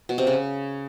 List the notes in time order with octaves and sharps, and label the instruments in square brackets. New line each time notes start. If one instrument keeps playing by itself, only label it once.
[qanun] B2
C3
C#3